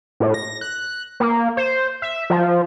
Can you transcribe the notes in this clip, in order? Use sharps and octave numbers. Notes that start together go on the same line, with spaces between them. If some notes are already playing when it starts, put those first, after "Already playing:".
A2
A#6
F#6
A#3
C5
E5
F3